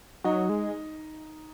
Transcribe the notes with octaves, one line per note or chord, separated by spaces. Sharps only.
F#3 D#4
G#3